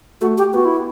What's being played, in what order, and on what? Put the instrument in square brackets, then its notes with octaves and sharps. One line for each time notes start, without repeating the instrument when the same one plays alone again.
[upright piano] A3 [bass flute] F#4
[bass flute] G4
[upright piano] B3 [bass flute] F#4
[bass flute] E4